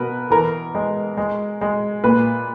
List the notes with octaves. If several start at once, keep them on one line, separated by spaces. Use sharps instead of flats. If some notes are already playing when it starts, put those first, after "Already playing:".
Already playing: B2 A#4 B4
E3 A#4
G#3
G#3
G#3
A#2 B4